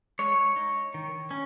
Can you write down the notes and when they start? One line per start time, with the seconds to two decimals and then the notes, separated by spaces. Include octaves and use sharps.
0.19 G#3 C#5
0.56 D#4
0.94 D#3
1.31 C#4